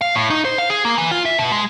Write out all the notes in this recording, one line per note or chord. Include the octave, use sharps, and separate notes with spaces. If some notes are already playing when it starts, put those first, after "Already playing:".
F5
A2
D#4
C5
F5
G#4
A#3
E3
F4
E5
B2
G#3